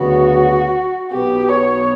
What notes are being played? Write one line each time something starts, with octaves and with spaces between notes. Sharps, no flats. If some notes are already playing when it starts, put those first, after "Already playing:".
Already playing: D2 C#3 F#3 B3 F#4
B1 B2 F#3 B3 G4
C#5